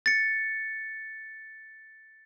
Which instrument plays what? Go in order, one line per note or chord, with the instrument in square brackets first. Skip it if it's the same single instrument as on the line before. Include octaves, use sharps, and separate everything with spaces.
[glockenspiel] A6 C#7